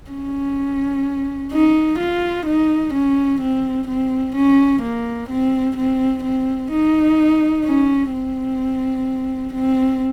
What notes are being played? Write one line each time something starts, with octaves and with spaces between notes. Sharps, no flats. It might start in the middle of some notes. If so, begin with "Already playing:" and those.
C#4
D#4
F4
D#4
C#4
C4
C4
C#4
A#3
C4
C4
C4
D#4
C#4
C4
C4